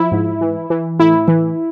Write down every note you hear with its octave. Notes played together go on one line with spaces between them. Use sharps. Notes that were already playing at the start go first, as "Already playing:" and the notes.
Already playing: F3 E4
G#2
E3
E3
A2 E4
E3